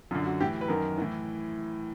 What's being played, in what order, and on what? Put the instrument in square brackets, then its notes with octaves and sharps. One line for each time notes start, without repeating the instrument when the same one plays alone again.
[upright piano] F#2 D3 F4
F#4
A2 E3 G4
B4
F#2 D#3 A#4
A2 E3